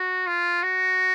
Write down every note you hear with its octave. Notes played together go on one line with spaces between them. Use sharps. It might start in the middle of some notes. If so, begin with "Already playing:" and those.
Already playing: F#4
F4
F#4